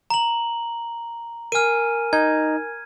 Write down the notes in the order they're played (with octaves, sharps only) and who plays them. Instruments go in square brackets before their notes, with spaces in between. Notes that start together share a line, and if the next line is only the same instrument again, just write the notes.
[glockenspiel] A#5 F#7
[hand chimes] A#4 G#5 [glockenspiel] F6 D#7
[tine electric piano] D#4 [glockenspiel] G#6